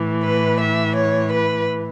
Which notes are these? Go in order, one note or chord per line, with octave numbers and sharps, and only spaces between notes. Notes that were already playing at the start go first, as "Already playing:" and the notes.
Already playing: A2 E3
B4
E5
C#5
B4